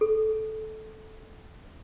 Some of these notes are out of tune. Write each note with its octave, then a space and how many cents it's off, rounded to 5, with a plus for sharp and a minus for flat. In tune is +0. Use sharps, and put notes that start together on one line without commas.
A4 -15